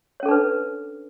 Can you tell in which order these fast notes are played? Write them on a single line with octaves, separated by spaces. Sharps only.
C#5 C#4 A4 D4 B4